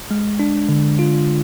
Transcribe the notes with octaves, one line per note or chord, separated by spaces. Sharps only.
G#3
D4
D3
F4